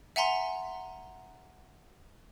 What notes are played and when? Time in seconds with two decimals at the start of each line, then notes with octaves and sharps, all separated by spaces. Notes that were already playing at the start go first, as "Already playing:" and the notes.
0.16 E5 F#5 G#5 A#5 C6